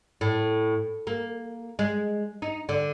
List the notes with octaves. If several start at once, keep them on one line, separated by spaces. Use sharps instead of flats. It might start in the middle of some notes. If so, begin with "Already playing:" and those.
A2
A#3
G#3
D#4
D3